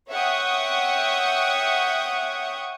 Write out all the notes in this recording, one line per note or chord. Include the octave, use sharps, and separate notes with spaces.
C#5 E5 F#5 G5 C#6 D#6